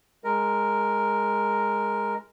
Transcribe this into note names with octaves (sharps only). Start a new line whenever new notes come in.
G#3 A#4